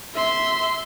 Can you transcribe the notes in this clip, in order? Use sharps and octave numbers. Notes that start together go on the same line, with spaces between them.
E5 C6